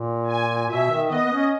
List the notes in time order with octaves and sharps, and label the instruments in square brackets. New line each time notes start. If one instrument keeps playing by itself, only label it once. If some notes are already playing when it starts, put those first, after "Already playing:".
Already playing: [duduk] A#2
[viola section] G#5
[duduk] B2 [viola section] E5
[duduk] D#3
[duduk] B3 [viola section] D#5
[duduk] B3
C#4